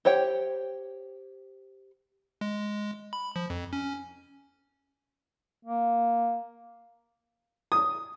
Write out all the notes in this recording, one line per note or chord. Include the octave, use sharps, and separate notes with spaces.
G4 C5 C#5 G5
G#3
B5
F3
F2
C#4
A#3
D#6